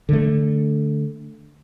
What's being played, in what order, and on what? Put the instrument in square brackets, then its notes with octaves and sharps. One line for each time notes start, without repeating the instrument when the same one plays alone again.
[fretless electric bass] D3 A3